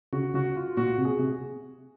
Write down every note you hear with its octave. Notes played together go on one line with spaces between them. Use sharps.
C#3 F#4
C#3 F#4
F4
A#2 F#4
C3
G#4
C3